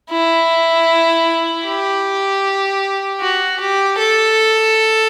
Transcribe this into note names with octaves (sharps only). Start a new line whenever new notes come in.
E4
G4
F#4
G4
A4